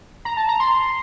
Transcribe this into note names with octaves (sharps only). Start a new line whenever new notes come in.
A#5
A5
A#5
C6